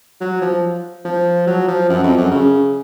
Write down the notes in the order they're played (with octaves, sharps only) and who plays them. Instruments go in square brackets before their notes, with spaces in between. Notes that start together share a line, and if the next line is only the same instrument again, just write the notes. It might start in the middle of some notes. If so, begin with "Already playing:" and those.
[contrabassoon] F#3
F3
F3
F#3
F3
F#2
F2
F#2
C#3